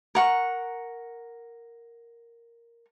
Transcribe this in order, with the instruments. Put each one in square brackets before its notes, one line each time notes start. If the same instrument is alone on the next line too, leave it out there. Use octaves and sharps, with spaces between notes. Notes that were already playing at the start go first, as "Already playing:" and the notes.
[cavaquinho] A#4 F#5 C#6